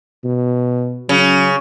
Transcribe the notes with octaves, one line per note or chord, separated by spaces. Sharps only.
B2
C#3 F#3